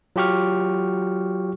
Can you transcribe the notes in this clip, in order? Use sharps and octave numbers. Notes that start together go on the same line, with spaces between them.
F#3 F4 G4 C#6 F6